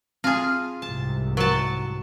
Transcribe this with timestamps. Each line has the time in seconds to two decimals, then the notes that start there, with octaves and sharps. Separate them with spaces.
0.24 C4 F4 G#4
0.82 C2 G#2 C3 A5
1.37 F#3 A#4 A5